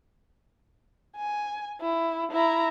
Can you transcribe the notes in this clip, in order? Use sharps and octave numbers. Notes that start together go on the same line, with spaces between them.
G#5
E4
E4 A#5